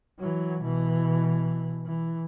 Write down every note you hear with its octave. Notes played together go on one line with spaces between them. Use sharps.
E3 F#3
B2 E3
E3